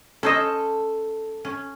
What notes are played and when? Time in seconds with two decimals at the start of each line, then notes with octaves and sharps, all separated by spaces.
0.23 C#4 A4 C5 D#5
1.45 C#4